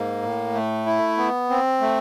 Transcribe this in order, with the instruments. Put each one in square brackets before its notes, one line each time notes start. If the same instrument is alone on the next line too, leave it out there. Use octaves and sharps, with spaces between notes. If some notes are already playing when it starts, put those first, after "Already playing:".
Already playing: [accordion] G#2 A#3
A2
A3
E4
B3
C4
A3